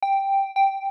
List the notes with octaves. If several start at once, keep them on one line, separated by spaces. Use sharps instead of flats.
G5
G5